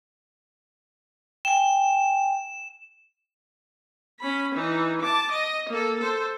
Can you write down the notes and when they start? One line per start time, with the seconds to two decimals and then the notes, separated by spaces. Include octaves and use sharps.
1.45 G5 G#5 E7
4.20 C#4 B5
4.55 E3 D#4
5.01 A5 D6
5.31 D#5
5.69 A#3 A4
6.01 A4 C5